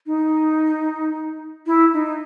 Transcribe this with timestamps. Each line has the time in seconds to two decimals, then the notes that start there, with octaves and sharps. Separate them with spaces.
0.06 D#4
1.66 E4
1.93 D#4